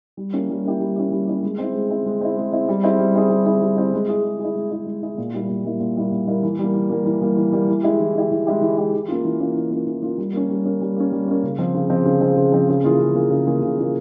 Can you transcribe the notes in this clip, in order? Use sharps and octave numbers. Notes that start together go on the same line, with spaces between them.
G3
A#3 C#4 E4 G4
G3
A#3 C#4 E4 G4
G3
A#3 C#4 E4 G4
G3
A#3 C#4 E4 G4
G#3
C4 E4
G#3
C4 E4
G#3
C4 E4
G#3
C4 E4
G3
C4 E4 G#4
G3
C4 E4 G#4
G3
C4 E4 G#4
G3
C4 E4 G#4
G#3
E4 G#4
G#3
E4 G#4
G#3
E4 G#4
G#3
E4 G#4
A#2
G3 A#3 E4
A#2
G3 A#3 E4
A#2
G3 A#3 E4
A#2
G3 A#3 E4
E3
G3 A#3
E3
G3 A#3
E3
G3 A#3
E3
G3 A#3
E3
G#3 E4 G4
E3
G#3 E4 G4
E3
G#3 E4 G4
E3
G#3 E4 G4
E3
A#3 C#4 F4
E3
A#3 C#4 F4
E3
A#3 C#4 F4
E3
A#3 C#4 F4
G3
A#3 C#4
G3
A#3 C#4
G3
A#3 C#4
G3
A#3 C#4
C#3
F3 C4
C#3
F3 C4
C#3
F3 C4
C#3
F3 C4
C#3
E3 A#3 F4 G#4
C#3
E3 A#3 F4 G#4
C#3
E3 A#3 F4 G#4
C#3
E3 A#3 F4 G#4